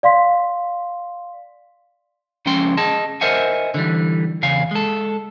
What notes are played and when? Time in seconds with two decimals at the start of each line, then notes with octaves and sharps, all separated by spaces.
0.03 D5 F5 C6 B6
2.46 C#2 C#3 F3 C#4 G5 C6
2.77 G#4 D#5 A5
3.21 A#4 C5 D#5 E5 F#5 G#5
3.74 D3 E3 G3
4.43 E2 C#3 F5 G#5
4.71 G#3 A4